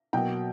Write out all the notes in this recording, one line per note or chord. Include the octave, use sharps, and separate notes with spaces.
B2 F#3 A#3 G5